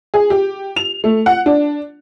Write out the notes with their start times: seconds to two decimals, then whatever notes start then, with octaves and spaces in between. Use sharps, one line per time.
0.14 G#4
0.30 G4
0.76 F7
1.04 A3
1.26 F#5
1.46 D4